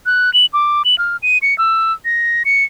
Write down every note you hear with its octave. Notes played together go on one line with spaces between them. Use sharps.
F#6
F#7
D6
F#7
F6
D#7
C#7
E6
A#6
C#7